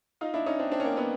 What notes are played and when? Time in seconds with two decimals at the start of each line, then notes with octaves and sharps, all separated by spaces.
0.21 D#4 F4
0.34 D4 E4
0.46 C#4 D#4
0.59 C4 D4
0.72 C4 D4
0.80 C#4
0.84 A#3 C4
0.97 B3 C#4